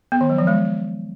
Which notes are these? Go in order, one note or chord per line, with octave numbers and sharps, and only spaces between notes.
B3
D#3
F#3
F3
G#3